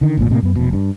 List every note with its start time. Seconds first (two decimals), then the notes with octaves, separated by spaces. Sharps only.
0.01 D3 D#3
0.17 G#1 D#2 A#2
0.30 A2 C3 F#3 A#3
0.43 F#2 B3
0.56 F1 B2
0.73 G2